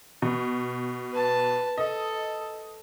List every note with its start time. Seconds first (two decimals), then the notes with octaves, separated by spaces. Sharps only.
0.22 B2
1.11 B4 A5
1.78 A4 D#5